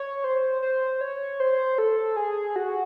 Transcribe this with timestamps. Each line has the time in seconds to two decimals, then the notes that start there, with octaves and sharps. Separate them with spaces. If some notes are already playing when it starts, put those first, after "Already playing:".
Already playing: C#5
0.24 C5
0.62 C5
1.01 C#5
1.40 C5
1.78 A4
2.16 G#4
2.56 F#4